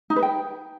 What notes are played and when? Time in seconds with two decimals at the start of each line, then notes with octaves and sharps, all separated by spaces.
0.10 D#4
0.16 B4
0.22 G5